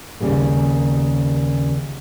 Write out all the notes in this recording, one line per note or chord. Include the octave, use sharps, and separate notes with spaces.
D#2 A2 C#3 G3 A#3